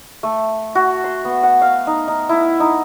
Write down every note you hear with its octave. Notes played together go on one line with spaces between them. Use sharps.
A3
F#4
C6
B3
F#5
F5
D#4
D#4
E4
D#4